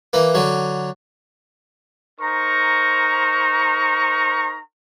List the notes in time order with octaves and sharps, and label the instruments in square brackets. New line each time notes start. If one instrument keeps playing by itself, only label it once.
[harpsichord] E3 A#3
D3 F#3
[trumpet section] D#4 A#4 C5 A#5 C#6